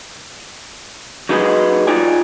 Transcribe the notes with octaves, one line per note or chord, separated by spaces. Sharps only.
F#3 D#4 G#4 B4 D#5
D#4 F4 D5 G#5